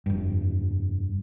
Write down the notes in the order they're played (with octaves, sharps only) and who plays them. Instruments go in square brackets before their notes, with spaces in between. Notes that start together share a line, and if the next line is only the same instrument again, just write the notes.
[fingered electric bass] F1 G2